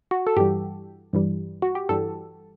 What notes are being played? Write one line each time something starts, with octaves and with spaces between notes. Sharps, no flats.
F#4
A4
G2 E3 G3 G4
G2 E3 G3
F#4
G4
G2 E3 G3 A4